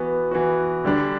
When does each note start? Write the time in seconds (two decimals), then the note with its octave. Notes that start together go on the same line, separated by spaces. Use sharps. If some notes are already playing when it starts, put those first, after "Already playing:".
Already playing: E3 B3 F#4
0.31 E3 B3 F#4
0.85 D3 G3 D4